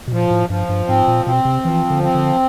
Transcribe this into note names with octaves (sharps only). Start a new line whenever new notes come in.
B2
A#2 F3
A2
G2 F3
G2
G#2 C4
A#2
B2 C4
C3
E3 F3
D3
C4
D3